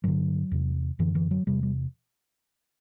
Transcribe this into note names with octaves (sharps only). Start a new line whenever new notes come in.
G2 D3 F#3
E2 C3
F#2 D3 E3
E3
F#3
E2 C3 G3
G3